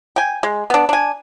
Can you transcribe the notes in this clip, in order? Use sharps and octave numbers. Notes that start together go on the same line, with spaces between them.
G5 G#5
G#3
B3 D4
D4 G#5